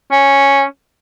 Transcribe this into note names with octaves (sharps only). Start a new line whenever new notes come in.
C#4